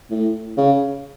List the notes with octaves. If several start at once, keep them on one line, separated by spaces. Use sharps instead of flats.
A2
C#3